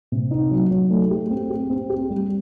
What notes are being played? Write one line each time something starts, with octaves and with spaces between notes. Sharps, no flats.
C3
D#4
F#3
F#3
A3
G4
C4
G4
C4
G4
G3